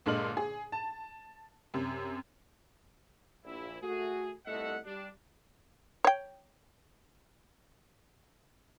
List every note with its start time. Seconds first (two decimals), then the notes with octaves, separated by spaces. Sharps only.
0.06 G1 A#2 D3 G#3 F6 F#7
0.37 G#4
0.72 A5
1.74 F#2 C3
3.45 A#1 E4
3.82 A3 F#4 G#4
4.45 G1 C2 A3 D#5 E5 F#5
4.85 G3 D4
6.05 C#5 G5